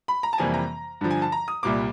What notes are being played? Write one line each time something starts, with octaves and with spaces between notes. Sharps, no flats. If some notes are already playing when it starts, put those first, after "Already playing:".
B5
A#5
A5
F2 C3 E3 G3 A#3 G#5
A#5
G2 D3 F3
G#5
A5
A#5
D#6
C2 A#2 G3 A#3 D6